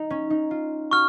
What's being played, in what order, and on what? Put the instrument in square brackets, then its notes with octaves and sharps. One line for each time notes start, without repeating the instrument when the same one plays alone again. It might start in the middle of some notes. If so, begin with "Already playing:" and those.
Already playing: [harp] D#4
C#4
D#4
F4
[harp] F#4 [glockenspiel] C#6 F6